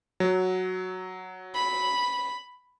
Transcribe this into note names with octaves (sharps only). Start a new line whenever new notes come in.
F#3
B5